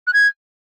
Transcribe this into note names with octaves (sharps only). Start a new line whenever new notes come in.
F#6
G#6